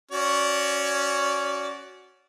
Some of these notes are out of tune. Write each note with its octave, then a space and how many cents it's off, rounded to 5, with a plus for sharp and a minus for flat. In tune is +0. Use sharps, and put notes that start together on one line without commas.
C#4 +0 F#4 +0 D5 -20